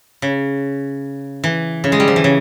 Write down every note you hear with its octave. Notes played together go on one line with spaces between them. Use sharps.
C#3
E3
C#3
G#3
G3
F3
E3
C#3